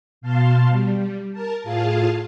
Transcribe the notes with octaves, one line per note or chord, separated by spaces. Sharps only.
B2 F5 A5 C6
G3
A#4 A5
A2 F4 G#4 F5 A5